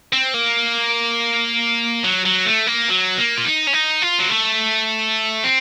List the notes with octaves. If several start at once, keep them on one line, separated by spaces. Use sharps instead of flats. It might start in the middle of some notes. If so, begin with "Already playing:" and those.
C4
A#3
F#3
F#3
A3
A#3
F#3
A#3
F4
D#4
C#4
D#4
F4
F#3
A3
C4